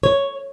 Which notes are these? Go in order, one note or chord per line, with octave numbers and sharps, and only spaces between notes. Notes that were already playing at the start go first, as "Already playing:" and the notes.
C#5